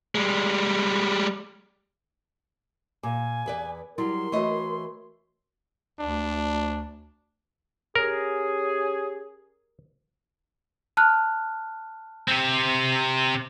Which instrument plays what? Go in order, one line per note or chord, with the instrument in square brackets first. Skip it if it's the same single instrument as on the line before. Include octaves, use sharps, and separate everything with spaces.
[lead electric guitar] G3 G#3
[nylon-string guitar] A#2 [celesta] F5 D6 [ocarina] G#5
[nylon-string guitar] E2 B4 D5
[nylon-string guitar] F#3 G3 [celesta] E4 [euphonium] A#4 [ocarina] C6
[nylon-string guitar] E3 A3 D#5 [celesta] F#4 C#5 C#6
[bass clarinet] D2 [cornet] D4
[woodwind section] C#4 G4 G#4 [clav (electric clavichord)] A#4
[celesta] A5 F6 F#6
[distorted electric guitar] C3 C4